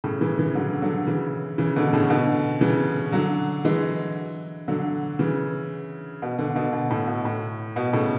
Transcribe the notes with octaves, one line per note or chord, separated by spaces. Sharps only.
A2 C#3
C#3 E3
C#3 E3
D3 F#3
D3 F#3
C#3 E3
C#3 E3
B2 D3
A2 C#3
B2 D3
C#3 E3
D3 F#3
E3 G#3
D3 F#3
C#3 E3
B2
B2 D3
B2 D3
B2
A2
B2
A2
B2
A2 C#3